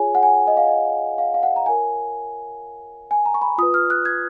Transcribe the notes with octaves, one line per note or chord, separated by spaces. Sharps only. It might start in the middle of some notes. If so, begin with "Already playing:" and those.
Already playing: F4 G#4 C#5 G#5
F#5
G#5
D#5
F5
D#5
F5
F5
F#5
A#5
F4 A#4 C#5 G#5
G#5
A#5
C#6
B5
F4 B4 D#6
F6
F#6
G#6